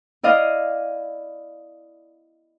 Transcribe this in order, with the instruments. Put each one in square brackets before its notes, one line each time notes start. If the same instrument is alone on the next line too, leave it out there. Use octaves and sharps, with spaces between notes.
[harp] E4 D5 D#5 F5